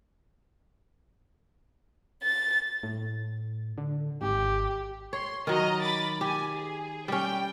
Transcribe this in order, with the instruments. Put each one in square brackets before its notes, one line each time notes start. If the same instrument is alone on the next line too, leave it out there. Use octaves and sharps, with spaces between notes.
[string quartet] A6
[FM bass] A2
D3
[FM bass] G#1 [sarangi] G4
[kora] C#5 [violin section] C6
[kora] D#3 F#3 [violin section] D#5 A#5
[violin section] B5 D6 A6
[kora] G4 [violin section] G#5
[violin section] G#4
[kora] G3 C#4 [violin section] G5